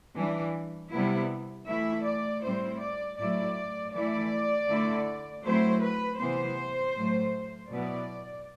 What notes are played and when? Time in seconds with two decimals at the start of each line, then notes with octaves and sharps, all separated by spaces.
0.15 E3 G3 D4
0.91 C3 G3 B3 E4
1.66 E3 A3 E4 E5
2.03 D5
2.42 A2 G3 C4 E4 C5
2.79 D5
3.17 A2 F#3 A3 E4 D5
3.92 E3 A3 E4 D5
4.68 D3 A3 E4
5.43 F#3 A3 C4 E4 C5
5.80 B4
6.18 C3 E3 B3 C5
6.94 A2 F#3 A3
7.69 B2 F#3 B3 E4 D5